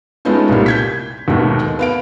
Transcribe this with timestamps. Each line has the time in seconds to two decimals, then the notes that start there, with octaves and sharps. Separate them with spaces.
0.25 G#3 A3 B3 C#4 D#4 F4
0.49 C2 A#2 G3
0.66 G6 G#6 B6
1.28 D#2 G#2 B2 D#3 A3 A#3
1.79 B3 F5 D7